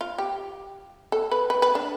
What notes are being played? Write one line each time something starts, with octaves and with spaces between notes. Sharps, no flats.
F4
G4
A4
B4
B4
B4
D4